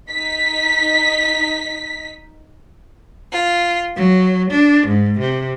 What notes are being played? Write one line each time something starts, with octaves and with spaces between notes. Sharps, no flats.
D#4 B6
F4
F#3
D4
G#2
C3